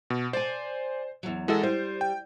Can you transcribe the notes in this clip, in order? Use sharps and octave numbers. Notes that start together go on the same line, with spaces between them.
B2
C5 D5 G#5
E2 F#3
E3 G#3 F#4 A4 A#4
G3 C5
G5